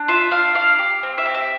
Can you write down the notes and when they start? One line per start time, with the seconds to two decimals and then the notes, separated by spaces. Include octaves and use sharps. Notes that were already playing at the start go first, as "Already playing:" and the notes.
Already playing: D4
0.08 F4 E5
0.31 D4 F5
0.55 D4 F5
0.79 G4
1.03 C4
1.18 E5
1.26 G4
1.34 E5